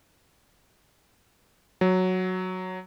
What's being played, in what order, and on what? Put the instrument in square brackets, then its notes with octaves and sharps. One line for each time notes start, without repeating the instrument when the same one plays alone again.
[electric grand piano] F#3